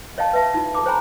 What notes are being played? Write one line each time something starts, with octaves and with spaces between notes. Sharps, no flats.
C#5 D#5 F5 G5 A5
B4 E5 A5
D#4 F4
A4 A5 D6
C5 C#5 G5 G#5 A#5 B5